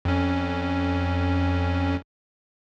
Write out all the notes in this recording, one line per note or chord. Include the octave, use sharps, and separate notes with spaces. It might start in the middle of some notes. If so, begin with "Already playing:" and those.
F2 C#4